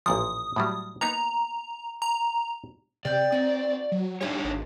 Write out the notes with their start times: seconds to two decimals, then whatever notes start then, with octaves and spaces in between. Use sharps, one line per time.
0.06 A1 A#2 F3 D#6
0.56 A2 F#3 G3
1.01 A#3 B3 D#4 A#5
2.02 A#5
3.05 C3 D5 G5 F6 G6
3.32 C4 D#4 F#4
3.92 F#3
4.21 G3 A3 D4 D#4 F4 C#5 G#5
4.44 G#1